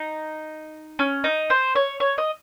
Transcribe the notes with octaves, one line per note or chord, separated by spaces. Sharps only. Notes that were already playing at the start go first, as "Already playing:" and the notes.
Already playing: D#4
C#4
D#4
C5
C#5
C#5
D#5